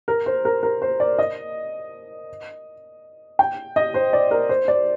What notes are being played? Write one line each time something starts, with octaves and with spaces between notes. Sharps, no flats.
A#4
C5
A#4
A#4
C5
D5
D#5
G5
D#5
C5
D5
A#4
C5
D5